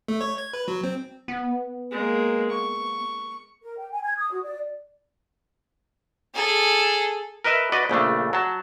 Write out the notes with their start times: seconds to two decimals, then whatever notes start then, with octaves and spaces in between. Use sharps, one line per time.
0.08 A3
0.21 C#5
0.38 G#6
0.53 B4
0.68 F#3
0.84 C4
1.28 B3
1.91 G#3 A#3
2.50 C#6
3.62 A#4
3.78 G5
3.91 G#5
4.04 G#6
4.18 D#6
4.31 F#4
4.43 D5
6.35 G#4 A4
7.44 A#4 B4 D#5 E5
7.72 F#4 B4 D5 D#5
7.89 A#1 C#3 A3 D4
8.33 F#3 A5